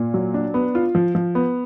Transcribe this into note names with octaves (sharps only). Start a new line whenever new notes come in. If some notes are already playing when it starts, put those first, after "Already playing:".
Already playing: A#2
F#3
D4
B3
F4
F3
F3
B3